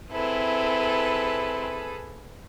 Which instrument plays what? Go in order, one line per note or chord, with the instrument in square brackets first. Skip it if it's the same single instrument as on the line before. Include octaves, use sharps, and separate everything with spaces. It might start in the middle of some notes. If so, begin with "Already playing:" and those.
[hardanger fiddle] C4 E4 [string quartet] G#4 A4 B4